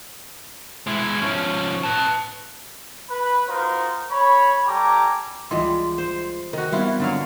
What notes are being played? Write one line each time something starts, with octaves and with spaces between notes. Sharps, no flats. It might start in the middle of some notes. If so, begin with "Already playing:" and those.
G#3 E4
F3 C#4
B4 A5
B4
D#4 F4 F#4 A#4 C5
C#5 B5
G3 G4 A4 G#5 A#5 D6
C#2 E3 G3 G#3 F4 C6
C5
D#3 F#4
E3 G3 B3 C4 E4 F4
D3 F#3 F5